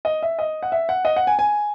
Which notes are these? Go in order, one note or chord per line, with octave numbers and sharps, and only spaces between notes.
D#5
E5
D#5
F#5
E5
F#5
D#5
F#5
G#5
G#5